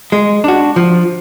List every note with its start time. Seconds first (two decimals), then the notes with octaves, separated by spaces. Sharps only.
0.12 G#3
0.44 D4 F#4
0.76 F3